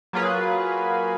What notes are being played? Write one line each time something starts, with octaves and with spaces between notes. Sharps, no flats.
F#3 A#3 F4 G#4 B4